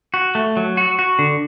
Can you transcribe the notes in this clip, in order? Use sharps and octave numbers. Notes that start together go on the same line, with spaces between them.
F#4
A3
F#3
F#4
F#4
D3